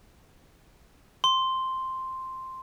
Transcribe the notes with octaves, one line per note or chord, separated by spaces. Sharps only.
C6